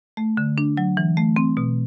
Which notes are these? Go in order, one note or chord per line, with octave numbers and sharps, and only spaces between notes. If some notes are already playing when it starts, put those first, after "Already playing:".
A3
D3
D4
F#3
E3
A3
C4
B2